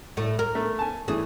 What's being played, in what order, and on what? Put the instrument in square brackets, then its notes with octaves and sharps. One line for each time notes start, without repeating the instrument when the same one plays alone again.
[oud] A2 A3
A#4
[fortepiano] A3
G#5 A5
[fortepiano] E3 A3 [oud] G#4